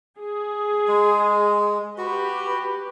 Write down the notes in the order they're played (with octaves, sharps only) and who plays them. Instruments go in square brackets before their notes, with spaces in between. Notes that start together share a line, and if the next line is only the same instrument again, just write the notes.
[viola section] G#4
[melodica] G#3
[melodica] F#4 [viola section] G4 B4